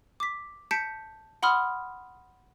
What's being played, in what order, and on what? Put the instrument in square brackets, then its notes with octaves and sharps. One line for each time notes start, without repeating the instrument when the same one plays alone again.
[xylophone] D6 B6
A5 G6 B6 C#7 D7
F#5 B5 C6 D#6 F6